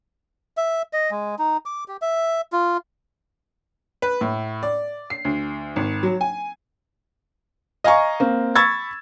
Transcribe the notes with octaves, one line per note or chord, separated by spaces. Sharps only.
E5
D#5
G#3
D#4
D6
G4
E5
F4
B4
A2
D5
C7
D2
G#1
F#3
G#5
D#5 F5 G#5 A#5 C#6
A#3 C4
B5 C#6 E6 G#6 A6